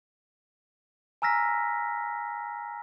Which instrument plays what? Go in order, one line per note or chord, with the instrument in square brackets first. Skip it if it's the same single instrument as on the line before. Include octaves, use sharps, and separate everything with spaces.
[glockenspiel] G#5 A#5 E6 F6 A#6 B6